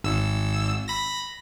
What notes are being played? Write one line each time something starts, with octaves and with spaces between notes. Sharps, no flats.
G#1 E6
B5 A#6